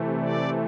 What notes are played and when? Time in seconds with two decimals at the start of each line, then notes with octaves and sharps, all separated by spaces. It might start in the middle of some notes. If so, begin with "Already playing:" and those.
Already playing: C3 E3 A3
0.19 D5